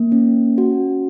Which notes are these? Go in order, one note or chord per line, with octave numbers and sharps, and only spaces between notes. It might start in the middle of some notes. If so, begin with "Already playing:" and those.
Already playing: A#3
C#4
F#4